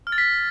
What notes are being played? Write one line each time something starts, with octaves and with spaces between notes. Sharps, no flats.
F6
A6
B6